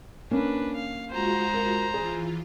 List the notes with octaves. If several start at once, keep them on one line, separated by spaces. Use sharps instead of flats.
A#3 C#4 D4 B4
F5
G#3 F4 F#4 C5 A#5
A#4
E3 F4 G#4